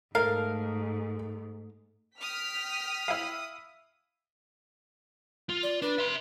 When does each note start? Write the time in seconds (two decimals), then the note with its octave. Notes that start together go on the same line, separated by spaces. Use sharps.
0.15 G#2 A3 A#4 F5
2.21 G5 D#6 F6 B6
3.08 E4 F5
5.49 F4
5.63 D5
5.82 D4 B4
5.98 E5 C6